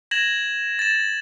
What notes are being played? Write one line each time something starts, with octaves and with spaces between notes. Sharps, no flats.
G#6 A#6 E7 F#7
A6 E7